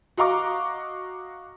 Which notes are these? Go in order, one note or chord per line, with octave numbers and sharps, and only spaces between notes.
F#4 D#5 F5 A#5 C#6 D6